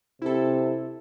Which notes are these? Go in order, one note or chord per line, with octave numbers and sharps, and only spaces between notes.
C3 E4 A4